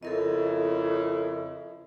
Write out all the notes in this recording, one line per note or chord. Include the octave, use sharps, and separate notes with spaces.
F2 C#3 E4 A4 A#4 D#5